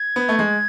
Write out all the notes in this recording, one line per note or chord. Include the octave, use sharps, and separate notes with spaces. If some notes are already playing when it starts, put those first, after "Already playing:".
Already playing: G#6
B3
A3
G#3